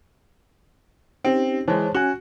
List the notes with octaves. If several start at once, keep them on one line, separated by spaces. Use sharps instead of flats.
C4 C#4 D#4 G4
E3 G#3 C5 C#5 A5
C#4 F#4 G#5